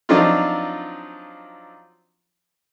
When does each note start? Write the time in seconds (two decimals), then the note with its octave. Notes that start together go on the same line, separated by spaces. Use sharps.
0.09 F3 F#3 C4 D4 D#4 F4